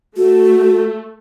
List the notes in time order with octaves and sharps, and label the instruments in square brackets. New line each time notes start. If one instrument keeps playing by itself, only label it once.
[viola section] A3 [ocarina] F#4